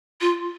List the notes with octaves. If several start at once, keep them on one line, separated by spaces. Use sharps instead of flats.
F4